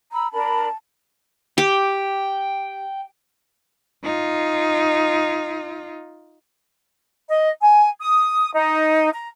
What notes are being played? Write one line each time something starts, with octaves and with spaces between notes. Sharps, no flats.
A#5 B5 E6
D4 A#4 A5 B5
G4 G5
D#4 F4
D#5
G#5
D#6
D#4
A#5